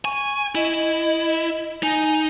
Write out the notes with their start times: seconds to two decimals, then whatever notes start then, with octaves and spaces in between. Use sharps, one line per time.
0.05 G#5 C#6
0.55 E4 D#5
1.83 D#4 G#5